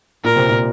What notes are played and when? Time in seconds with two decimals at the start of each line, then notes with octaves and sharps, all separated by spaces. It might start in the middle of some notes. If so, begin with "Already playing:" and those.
0.24 A#2 A#4
0.36 C3
0.49 A#2